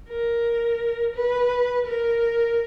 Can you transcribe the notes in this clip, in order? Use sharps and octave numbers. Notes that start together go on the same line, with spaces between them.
A#4
B4
A#4